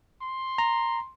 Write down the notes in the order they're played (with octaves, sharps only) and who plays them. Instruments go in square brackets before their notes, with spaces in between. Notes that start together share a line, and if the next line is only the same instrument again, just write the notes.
[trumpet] C6
[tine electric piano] A#5